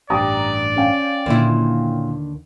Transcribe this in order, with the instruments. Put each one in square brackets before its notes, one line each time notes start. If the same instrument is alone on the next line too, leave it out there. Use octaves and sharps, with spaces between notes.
[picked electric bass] A1 G2 [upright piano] G4 A#5 D#6 [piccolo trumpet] D5
[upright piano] C#4 F5 G5
[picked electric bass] D#2 D3 D#3 [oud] A#2 E4